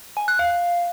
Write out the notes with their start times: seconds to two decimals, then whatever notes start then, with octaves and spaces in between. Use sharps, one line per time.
0.17 G#5
0.28 F#6
0.39 F5